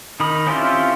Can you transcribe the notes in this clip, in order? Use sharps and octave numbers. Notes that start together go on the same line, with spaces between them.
D#3 D#4 A#4 B5 D#6
C4 C#4 E4 F4 G4